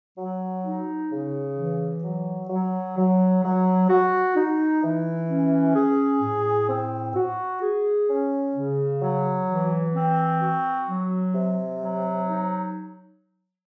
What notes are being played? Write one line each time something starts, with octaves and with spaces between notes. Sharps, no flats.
F#3
D#4
C#3
E3
F#3
F#3
F#3
F#3
F#4
D#4
E3
C#4
G#4
A2
C4
F#4
G#4
C#4
C#3
F#3
E3
C4
F#4
F#3
C3
F#3
D#4